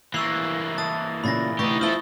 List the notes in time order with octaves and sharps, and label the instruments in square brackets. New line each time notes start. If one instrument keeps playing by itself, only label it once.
[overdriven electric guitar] E3 A#3 [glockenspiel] C#6 E6 C7
[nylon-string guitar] A5 [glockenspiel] D#6 A6
[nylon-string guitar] A#2 C#3 [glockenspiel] B5 A6 A#6
[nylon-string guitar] D2 C3 E3 [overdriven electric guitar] D#4 G4 [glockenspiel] C#6 A#6
[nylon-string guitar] E2 E4 C5 [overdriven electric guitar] F3 A4 [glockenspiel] D#6 G7